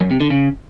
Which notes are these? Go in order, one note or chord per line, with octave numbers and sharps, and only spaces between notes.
F#2
C3
D3
C#3